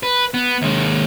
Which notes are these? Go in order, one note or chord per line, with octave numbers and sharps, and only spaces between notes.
B4
B3
D#2 G#3